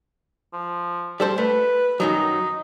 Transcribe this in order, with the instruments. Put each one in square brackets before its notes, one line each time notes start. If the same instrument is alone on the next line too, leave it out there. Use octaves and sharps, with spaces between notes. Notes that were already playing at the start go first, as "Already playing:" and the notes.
[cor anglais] F3
[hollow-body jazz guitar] G3 A4 C5
[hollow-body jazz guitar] A3 [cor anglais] B4
[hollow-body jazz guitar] F#2 D#3 F#3 [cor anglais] D#4